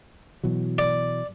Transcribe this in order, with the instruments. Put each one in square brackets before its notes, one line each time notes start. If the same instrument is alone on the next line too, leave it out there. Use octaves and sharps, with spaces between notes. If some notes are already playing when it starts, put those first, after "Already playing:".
[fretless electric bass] B2 E3 F#3
[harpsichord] D5